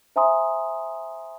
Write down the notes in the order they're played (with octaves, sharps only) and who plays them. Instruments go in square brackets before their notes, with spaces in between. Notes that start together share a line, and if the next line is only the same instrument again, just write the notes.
[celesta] C5 E5 G#5 A#5 C6 D#6